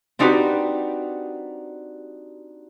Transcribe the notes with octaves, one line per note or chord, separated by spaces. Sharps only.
C4 D4 D#4 F#4 G4 B4